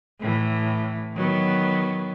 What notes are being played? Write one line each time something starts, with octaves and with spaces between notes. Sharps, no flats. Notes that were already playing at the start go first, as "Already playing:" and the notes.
A2 E3
D#3 F#3 B3